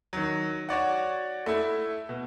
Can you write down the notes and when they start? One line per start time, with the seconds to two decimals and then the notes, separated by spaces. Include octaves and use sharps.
0.13 D#3 F#3
0.69 F#4 C#5 D5 F#5
1.46 A3 E4
2.09 B2